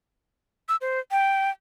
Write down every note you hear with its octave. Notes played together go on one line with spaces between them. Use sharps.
E6
C5
G5